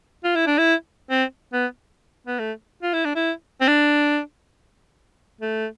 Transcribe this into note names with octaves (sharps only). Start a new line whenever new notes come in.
F4
E4
D4
E4
C4
B3
B3
A3
F4
E4
D4
E4
C4
D4
A3